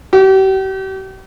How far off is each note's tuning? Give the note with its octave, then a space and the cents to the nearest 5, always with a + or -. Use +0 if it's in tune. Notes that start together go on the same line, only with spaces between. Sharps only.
G4 -40